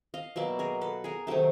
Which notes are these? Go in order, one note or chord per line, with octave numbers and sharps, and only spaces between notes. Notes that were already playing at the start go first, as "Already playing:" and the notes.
D#5 F5
B2 F#3 A#3 D5 E5
G#4 A#4
A4 B4
G#4 A#4
C3 D#3 F#3 A3 G4 A4